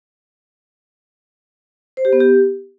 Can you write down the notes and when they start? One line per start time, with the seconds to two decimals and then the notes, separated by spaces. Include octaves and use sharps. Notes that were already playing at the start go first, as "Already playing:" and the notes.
1.97 C5
2.05 G4
2.13 B3
2.20 G4